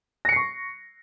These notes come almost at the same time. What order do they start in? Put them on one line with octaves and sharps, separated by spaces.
A#6 C#7 C7 C#6